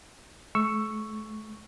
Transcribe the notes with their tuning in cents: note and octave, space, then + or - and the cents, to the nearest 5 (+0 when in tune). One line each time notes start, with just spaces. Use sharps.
A3 -40 C#6 +0 E6 +10